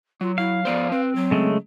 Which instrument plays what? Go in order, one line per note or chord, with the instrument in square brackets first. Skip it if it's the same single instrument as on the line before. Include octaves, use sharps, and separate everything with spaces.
[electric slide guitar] F#3 [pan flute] F4
[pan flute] E4 [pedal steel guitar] F5
[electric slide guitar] F3 B3 C5 [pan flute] D5
[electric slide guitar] C4 [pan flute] B4
[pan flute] F#3
[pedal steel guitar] C#3 G#3 A3